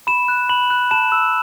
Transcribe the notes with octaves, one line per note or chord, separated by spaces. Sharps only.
B5 E7
F#6
B5 F#7
F#6
A5 E7
E6